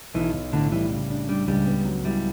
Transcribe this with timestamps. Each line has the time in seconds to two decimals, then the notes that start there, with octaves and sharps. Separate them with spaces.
0.14 B1 E3
0.33 B1
0.53 A2 D3
0.71 E3 G3
0.90 C#3
1.10 D4
1.28 G3 D4
1.47 C#2 G3
1.66 B3
1.85 F#3
2.05 G3 E4